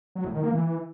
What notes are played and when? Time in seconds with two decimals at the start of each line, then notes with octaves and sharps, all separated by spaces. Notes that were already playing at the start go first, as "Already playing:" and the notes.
0.15 F#3
0.25 A2
0.34 D#3
0.43 A#3
0.52 E3